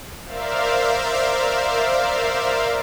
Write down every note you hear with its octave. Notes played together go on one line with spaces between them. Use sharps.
A#4 C5 D5 E5 F5